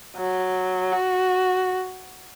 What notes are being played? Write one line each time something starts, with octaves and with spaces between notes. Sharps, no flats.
F#3
F#4